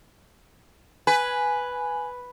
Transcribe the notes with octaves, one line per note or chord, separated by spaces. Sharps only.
B4 G#5